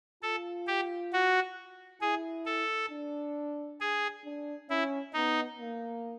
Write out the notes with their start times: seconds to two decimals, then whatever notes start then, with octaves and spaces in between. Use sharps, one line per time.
0.23 F4 A4
0.67 G4
1.13 F#4
2.01 E4 G#4
2.46 A4
2.91 D4
3.81 G#4
4.25 D4
4.69 C#4 E4
5.14 B3 D#4
5.59 A#3